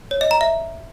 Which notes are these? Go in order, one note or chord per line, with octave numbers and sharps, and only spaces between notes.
C#5
D#5
A#5
E5